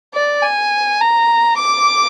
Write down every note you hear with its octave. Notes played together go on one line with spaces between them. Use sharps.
D5
G#5
A#5
D6